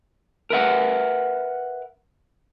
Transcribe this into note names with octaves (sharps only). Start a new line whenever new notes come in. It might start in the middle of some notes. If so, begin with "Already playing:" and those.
A#4 B4 E5 F#5